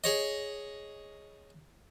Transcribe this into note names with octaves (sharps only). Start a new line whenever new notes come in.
G#4 C#5 D#5